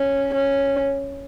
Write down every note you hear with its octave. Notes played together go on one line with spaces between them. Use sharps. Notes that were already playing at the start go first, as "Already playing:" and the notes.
Already playing: C#4
C#4